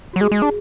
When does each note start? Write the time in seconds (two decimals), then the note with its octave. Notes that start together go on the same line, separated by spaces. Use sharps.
0.13 F#4
0.16 F#3
0.21 G#3 G#4
0.32 G#3
0.42 D4